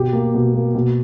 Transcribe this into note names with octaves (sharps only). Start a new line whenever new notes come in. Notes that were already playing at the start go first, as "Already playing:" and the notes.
Already playing: B2 G4
A#3
B2
A#3
B2